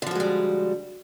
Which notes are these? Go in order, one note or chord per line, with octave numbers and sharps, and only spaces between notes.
D3 F3 G3 G#3 F#4